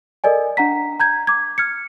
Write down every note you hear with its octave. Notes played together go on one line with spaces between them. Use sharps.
A4 A#4 D5 D#5 G#5
D4 F#5 A#5 B6
A#5 G6 G#6
D6 G#6
F6 G#6 C#7